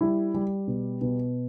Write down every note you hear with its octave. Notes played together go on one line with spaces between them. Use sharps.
G3 E4
G3
B2
B2